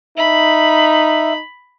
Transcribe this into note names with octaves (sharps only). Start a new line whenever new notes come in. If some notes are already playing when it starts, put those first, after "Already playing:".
D#4 E5 B5